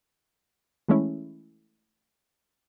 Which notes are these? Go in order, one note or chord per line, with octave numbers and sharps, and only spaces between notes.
E3 G#3 A3 C#4 E4